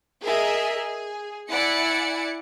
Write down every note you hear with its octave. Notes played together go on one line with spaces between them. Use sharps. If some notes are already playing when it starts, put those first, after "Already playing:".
G#4 A#4 D#5 E5
G#4
E4 D5 F#5 G#5 C#7